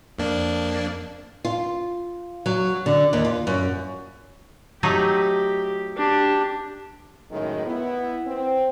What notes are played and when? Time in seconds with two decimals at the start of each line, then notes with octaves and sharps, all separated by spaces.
0.19 F2 A#3 D4
1.45 F4
2.46 F#3
2.86 D3
3.13 D#2
3.25 F4
3.47 F#2
4.83 F#3 A3 D#4 G4
5.97 D4 G4
7.30 F#2 A2 D#3 G#3
7.66 B3 E4
8.27 C4